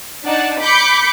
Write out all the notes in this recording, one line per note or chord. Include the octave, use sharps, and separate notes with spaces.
D4 D#4 D5 F#5 A5
B5 D6 G6 B6 C#7